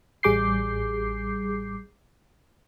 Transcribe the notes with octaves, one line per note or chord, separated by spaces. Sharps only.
A1 G3 G#4 D6 G6 C7